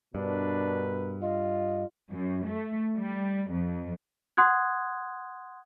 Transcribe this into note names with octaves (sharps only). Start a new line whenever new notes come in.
G2 B2 D4 A#4 B4
F4 D#5
F#2
A3
G3
F2
F#5 C6 D#6 F#6 G#6